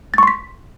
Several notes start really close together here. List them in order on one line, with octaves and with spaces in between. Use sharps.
A6 C#6 C6 B6